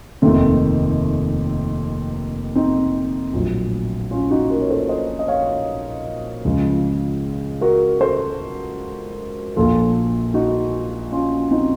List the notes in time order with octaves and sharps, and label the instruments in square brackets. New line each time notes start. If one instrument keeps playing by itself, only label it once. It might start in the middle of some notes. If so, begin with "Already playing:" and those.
[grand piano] F1 D#2 D#3 A3 C4
C4 D#4
A#1 A2 F#3
C#4 F4
D#4 F#4
F#4 A#4
C#5
A4 C5
C5 D#5
D#5
C#5 F5
C#2 C#3 F3
F#4 A#4
A4 C5
A#1 A#2 F3 F4 A4
D#4 F#4
C#4 F4
C4 D#4